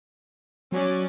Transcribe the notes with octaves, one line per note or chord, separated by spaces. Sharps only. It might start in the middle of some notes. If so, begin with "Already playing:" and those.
F#3 C#4 D5